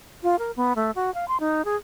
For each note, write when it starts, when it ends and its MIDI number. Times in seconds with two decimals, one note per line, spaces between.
0.23 0.38 65
0.39 0.51 70
0.56 0.73 59
0.76 0.91 57
0.95 1.13 66
1.14 1.25 77
1.28 1.39 84
1.40 1.65 63
1.65 1.76 68